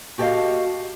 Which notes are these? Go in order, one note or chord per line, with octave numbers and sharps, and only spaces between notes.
F#4 G4 A4 C#5 D#5 F5